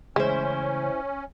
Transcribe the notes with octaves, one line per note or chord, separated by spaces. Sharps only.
C#3 E3 G#3 A3 C#4 E4 C5